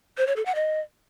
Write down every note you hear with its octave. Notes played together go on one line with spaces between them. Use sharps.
C5
C#5
A4
F#5
D#5